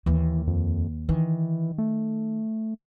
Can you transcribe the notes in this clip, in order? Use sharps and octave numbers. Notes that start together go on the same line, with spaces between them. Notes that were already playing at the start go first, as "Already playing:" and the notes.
D#2 E3 A#3
F2
D#3 E3
A3